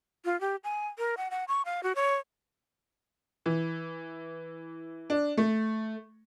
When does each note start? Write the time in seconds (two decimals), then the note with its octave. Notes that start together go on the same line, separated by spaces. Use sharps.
0.25 F4
0.41 G4
0.64 G#5
0.98 A#4
1.17 F#5
1.31 F#5
1.48 C#6
1.65 F5
1.83 F#4
1.95 C#5
3.46 E3
5.10 D4
5.37 A3